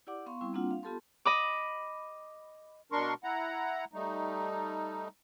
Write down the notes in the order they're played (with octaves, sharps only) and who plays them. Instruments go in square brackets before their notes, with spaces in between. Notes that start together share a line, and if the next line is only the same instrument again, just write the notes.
[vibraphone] E4 G4 D5 F#5 D6
B3 F5 C6 C#6
G3 C4 E4
G3 A#3 C4 D4 F4 F#5
F5
B3 F4 G4 A4 A5 C6
[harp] D#5 B5 D6
[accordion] B2 D4 A#4 C6 C#6
E4 F#5 A#5
G3 A3 D#4